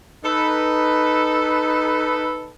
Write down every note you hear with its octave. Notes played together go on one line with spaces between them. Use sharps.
D#4 A4 B4